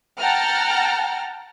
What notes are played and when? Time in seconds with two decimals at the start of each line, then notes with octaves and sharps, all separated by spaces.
0.20 F#5 G5 A5 A#5 F6